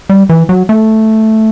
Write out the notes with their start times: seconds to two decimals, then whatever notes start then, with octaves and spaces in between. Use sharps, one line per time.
0.09 G3
0.29 E3
0.49 F#3
0.69 A3